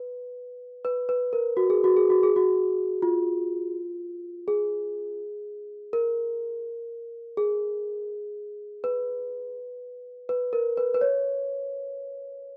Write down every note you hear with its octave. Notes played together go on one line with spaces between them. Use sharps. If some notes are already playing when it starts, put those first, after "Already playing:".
Already playing: B4
B4
B4
A#4
F#4
G#4
F#4
G#4
F#4
G#4
F#4
F4
G#4
A#4
G#4
B4
B4
A#4
B4
B4
C#5